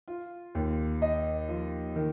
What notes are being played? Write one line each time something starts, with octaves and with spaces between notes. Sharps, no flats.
F4
D#2
D#5
F3
D#3